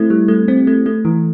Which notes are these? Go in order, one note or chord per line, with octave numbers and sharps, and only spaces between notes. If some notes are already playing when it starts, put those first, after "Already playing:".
Already playing: A3 C4 E4
G3
A3
C4
A3
A3
E3